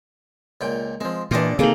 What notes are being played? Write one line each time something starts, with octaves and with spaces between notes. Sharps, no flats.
C#2 A#2 G5
F3 G#3 C4
E2 A#2 E3 D4 F4 G4 D#5
C3 D#3 A#3 G#4 A4 A#5